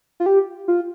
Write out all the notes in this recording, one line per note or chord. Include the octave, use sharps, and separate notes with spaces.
F4
G4
F4